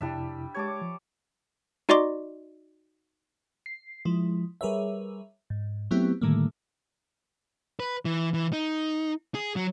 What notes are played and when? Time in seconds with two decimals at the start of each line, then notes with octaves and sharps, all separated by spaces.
0.01 F2 C3 G3 D4 E4 E5
0.55 G#3 G4 C#5 A5 D6 G#6
0.81 F3
1.89 D#4 F#4 D5 D#5 C6 D6
3.66 C7
4.05 F3 G#3 E4
4.61 G3 G#4 A#4 B4 C#5 E5
5.50 G#2
5.91 F#3 A3 B3 C4 E4 G4
6.21 A2 D3 D#3 G3 A3 A#3
7.80 B4
8.05 E3
8.34 E3
8.53 D#4
9.35 G#4
9.56 F#3